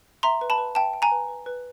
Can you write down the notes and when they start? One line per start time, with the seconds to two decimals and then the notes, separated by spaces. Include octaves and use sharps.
0.23 E5 A#5 C6
0.41 B4
0.50 A5 B5
0.58 B4
0.75 E5 G5 A5
0.93 G5
1.02 G#5 A#5
1.11 B4
1.28 B4
1.46 B4